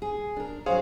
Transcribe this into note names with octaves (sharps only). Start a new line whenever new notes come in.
G#4
D4 A#4
F#3 D4 G#4 C5 C#5 F5